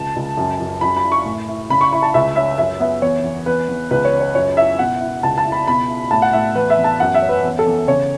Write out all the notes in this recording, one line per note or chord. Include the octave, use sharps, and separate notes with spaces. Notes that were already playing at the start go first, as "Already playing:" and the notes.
Already playing: C#2 A5
C#2
F#2
F#2
F#2 B5
B5
E4
C#6
A2
E4
C#3 B5
C#6
E4 B5
A5
C#2 E5
C#4 E5
F#2 E5
B3 E5
E2 C#5
E2
E2 B4
E2
C#2 B4
C#5
C#4
C#5
F#2 C#5
E4 E5
B2 F#5
E4
C#2 A5
A5
E4
B5
B2 B5
E4
A2 A5
F#5
A2 E5
E2 B4
E5
E2
A5
F#2 F#5
E5
C#4
B4
E2
A4
E2
C#3 C#5